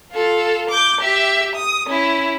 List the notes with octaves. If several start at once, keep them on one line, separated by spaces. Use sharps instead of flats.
F4 A4
D6 G6
G4 E5
D#6
C#4 E4